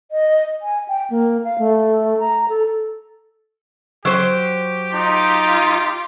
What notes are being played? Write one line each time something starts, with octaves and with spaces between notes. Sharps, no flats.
D#5
G#5
G5
A#3
F5
A3
A#5
A4
F#3 G4 C5
D#4 F4